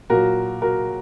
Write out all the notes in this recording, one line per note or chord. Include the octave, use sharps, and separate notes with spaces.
A#2 F#3 F#4 A#4
F#4 A#4